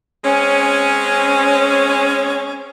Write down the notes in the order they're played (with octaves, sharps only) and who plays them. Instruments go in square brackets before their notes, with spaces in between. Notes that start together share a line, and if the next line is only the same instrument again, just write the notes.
[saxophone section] G#3 C4 C#4